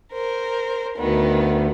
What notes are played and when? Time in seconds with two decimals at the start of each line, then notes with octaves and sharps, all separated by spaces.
0.11 A#4 C5
0.97 D2 D#3 B3